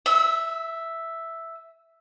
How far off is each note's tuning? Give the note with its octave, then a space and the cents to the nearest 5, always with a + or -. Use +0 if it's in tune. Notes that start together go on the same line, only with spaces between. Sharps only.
E5 +0 E6 -30